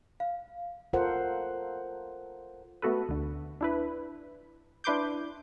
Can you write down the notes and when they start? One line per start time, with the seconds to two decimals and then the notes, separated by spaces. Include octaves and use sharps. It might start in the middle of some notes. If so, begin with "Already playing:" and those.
0.20 F5
0.93 F4 A4 A#4 C5 F#5
2.82 A3 B3 F#4 A4 B4
3.09 D2 D3
3.61 D4 E4 B4
4.84 D4 E4 B4 C6 D6 G6